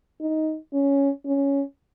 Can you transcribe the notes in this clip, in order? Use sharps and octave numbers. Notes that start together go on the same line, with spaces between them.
D#4
C#4
C#4